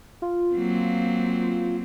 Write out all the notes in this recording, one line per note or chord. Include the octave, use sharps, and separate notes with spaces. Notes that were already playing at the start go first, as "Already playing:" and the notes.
F4
F#3 A#3 C4